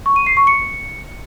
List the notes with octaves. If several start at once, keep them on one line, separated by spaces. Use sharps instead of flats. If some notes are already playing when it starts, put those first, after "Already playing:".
C#6
D#7
C7
C#6
C#7